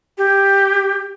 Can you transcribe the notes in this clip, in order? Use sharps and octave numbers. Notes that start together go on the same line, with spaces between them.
G4